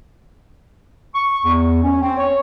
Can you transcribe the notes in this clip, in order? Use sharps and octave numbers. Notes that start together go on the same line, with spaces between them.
C#6
E2
C#4
C4
C#5